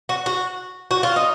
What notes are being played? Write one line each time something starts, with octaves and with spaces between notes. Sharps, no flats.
F#4
F#4
F#4
F4
D#4